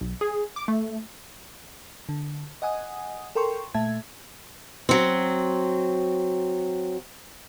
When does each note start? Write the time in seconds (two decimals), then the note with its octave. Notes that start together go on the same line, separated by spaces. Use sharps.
0.01 B1
0.21 G#4
0.56 D6
0.68 A3
2.09 D3
2.62 D#5 F#5 G#5 D#6
3.35 A4 A#4 G5 C6 C#6
3.74 A#2 A3 E5 A5 G#6
4.89 F#3 C4